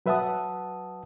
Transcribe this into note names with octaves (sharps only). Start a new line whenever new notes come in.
F#3 B4 E5 F#5 A5 D#6